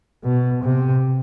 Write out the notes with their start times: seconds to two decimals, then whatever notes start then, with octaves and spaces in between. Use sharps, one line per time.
0.23 B2
0.63 C3